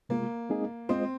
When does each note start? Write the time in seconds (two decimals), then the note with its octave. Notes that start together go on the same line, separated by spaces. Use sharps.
0.09 C3 G#3 A#3 F4
0.50 G#3 C4 D#4 G#4 D#5
0.89 G#3 C4 F4 C5 D#5